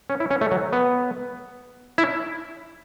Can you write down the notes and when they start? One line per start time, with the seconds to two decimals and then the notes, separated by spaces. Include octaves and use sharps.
0.10 C#4
0.20 E4
0.31 C#4
0.41 A3
0.51 F#3
0.73 B3
1.98 E4